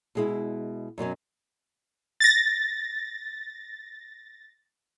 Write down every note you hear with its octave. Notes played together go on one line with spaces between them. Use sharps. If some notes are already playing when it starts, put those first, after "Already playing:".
B2 G#3 E4
F#2 B2 F#3 C#4
A6 A#6